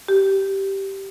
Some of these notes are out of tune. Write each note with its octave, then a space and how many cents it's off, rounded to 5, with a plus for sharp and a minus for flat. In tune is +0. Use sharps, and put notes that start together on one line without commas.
G4 -10